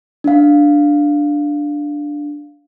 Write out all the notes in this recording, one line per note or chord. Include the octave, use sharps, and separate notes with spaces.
D4 F5